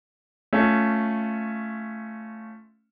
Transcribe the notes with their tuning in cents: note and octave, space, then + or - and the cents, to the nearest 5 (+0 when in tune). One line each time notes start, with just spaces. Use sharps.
A3 +0 C#4 +0 F4 -5